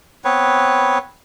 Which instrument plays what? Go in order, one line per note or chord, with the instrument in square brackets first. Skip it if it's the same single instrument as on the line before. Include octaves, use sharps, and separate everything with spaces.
[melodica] B3 C4 B4 C#5